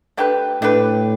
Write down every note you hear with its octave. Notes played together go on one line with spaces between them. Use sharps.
A3 D4 G4 B4
A2 A3 D4 G4 B4